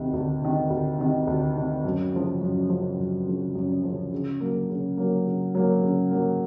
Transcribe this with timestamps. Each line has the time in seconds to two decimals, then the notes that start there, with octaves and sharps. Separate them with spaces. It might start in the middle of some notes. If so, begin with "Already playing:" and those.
Already playing: D2 C3 D#3
0.14 D2
0.42 C3 D#3
0.70 D2
0.99 C3 D#3
1.27 D2
1.56 C3 D#3
1.84 F#2
2.13 C#3 F3
2.42 F#2
2.70 C#3 F3
2.98 F#2
3.27 C#3 F3
3.55 F#2
3.84 C#3 F3
4.12 C#3
4.40 F#3 A#3
4.69 C#3
4.97 F#3 A#3
5.26 C#3
5.55 F#3 A#3
5.83 C#3
6.11 F#3 A#3